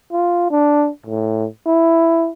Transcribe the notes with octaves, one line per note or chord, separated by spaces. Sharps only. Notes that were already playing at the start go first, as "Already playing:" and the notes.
F4
D4
A2
E4